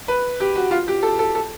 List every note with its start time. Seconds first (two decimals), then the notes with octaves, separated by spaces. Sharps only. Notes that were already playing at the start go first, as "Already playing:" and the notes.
0.08 B4
0.40 G4
0.56 F#4
0.71 F4
0.88 G4
1.03 A4
1.19 A4
1.35 A4